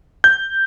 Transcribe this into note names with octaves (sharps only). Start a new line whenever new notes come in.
G6